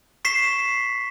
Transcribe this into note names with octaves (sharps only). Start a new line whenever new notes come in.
C#6 B6 C7 E7